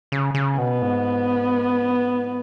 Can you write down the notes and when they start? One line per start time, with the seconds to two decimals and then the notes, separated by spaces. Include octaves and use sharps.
0.12 C#3
0.35 C#3
0.58 B2 B3
0.82 G#2